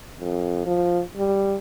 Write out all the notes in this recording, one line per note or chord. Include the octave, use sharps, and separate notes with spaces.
F2
F3
G3